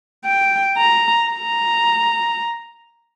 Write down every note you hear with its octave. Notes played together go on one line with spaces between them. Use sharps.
G5
A#5
A#5